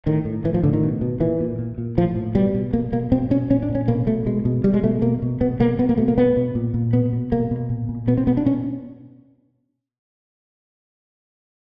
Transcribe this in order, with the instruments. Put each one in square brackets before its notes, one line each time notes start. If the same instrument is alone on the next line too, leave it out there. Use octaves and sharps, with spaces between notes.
[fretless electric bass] A2 D#3
A2
A2 E3
F3
A2 D3
D#3
B2
B2
A#2 E3
A#2
A#2
A#2
A2 F3
A2
B2 G3
B2
B2 A#3
B2 A#3
B2 C4
B2 C#4
A#2 C#4
D4
A#2
C#4
B2 A#3
B2 A3
B2 G#3
B2
B2 G3
G#3
B2 A3
B2 A#3
B2
B2 B3
B2 A#3
B2 B3
A#3
B2 A3
A#3
B2 B3
B2
A#2
A#2
B2 B3
B2
B2 A#3
B2
A#2
A#2
B2 B3
C4
B2 B3
D4
B2 C#4